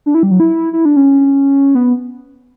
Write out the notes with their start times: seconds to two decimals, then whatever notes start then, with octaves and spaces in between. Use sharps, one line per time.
0.06 D4
0.14 E4
0.23 G3
0.31 F#3
0.40 E4
0.73 E4
0.85 D4
0.96 C#4
1.75 B3